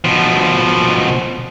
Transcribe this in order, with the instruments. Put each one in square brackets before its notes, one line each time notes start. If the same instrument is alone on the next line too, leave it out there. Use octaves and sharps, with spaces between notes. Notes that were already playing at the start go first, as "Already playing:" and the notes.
[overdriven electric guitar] B2 F3